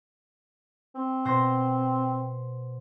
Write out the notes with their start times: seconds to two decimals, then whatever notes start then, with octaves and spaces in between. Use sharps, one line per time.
0.95 C4
1.25 B2 C5 A#6